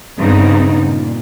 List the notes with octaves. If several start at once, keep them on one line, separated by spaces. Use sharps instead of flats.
G2 C#3 B3 C4 D#4
A#2